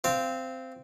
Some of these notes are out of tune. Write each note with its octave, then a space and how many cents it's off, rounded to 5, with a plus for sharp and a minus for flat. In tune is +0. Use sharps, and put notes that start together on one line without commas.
C4 -10 F5 -20